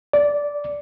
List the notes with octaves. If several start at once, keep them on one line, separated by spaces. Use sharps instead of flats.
D5